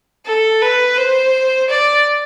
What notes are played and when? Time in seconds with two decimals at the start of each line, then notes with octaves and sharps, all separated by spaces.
0.26 A4
0.62 B4
0.97 C5
1.70 D5